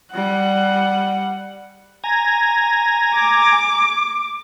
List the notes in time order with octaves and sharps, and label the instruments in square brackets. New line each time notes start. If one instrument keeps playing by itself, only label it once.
[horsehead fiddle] G3 F#5
[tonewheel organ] G#5 A#5
[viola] D6